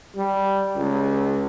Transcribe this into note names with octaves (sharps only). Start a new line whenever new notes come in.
G3
C#2